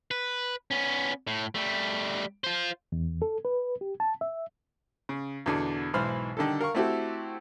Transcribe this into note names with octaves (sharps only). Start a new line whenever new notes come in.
B4
B3 C#4
A2
G3 A3
F4 C5
E2
A4
B4
G4
A5
E5
C#3
E2 B2 D3
B1 G#2 E3 C5 B5 F6
D3 D#3 G3 A4
A#4 F5 C#6
A3 C4 E4 F#4 G4 A4